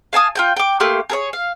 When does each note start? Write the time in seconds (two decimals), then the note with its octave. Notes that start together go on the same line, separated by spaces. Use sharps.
0.13 F5 G#5 A5 D#6
0.35 F4 G5 G6
0.57 G5 D6
0.80 A3 A#3 G4 C6
1.10 G#4 A#4 C#5
1.33 F5